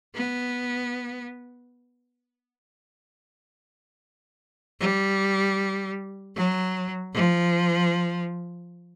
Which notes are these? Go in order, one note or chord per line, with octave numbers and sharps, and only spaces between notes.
B3
G3
F#3
F3